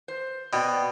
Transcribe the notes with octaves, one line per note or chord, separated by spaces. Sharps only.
C5
B2 D5 G5